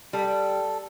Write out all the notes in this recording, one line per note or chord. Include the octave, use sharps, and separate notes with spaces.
G3 A4